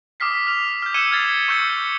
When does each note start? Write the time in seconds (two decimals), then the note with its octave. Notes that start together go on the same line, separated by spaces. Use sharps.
0.20 D6 D#6 F6 B6 C7
0.47 F6 F7
0.82 F6 G6
0.94 E6 G#6 C#7 D#7 E7 G7
1.11 F6 G#6 A6 B6 C7
1.48 C#6 E6 G6 C#7 G7